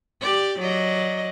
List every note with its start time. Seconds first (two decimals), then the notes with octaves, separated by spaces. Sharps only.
0.22 G4 D5
0.59 F#3 D5 D#5